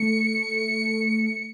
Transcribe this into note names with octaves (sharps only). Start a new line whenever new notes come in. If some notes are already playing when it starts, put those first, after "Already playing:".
Already playing: A3 C#7